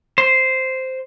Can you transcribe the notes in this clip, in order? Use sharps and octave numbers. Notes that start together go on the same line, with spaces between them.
C5